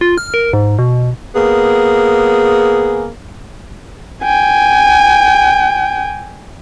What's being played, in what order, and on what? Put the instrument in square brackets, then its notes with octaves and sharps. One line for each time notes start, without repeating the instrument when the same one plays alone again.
[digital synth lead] F4
F6
A#4
G#2
B2
[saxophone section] A#3 B3 G#4
[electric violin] G5 G#5